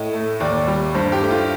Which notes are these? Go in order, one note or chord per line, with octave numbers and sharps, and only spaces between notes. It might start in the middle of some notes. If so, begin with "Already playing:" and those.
Already playing: A2 A3 D#5
A3
D#2 D5
G3
G2 C5
G4
A3
F4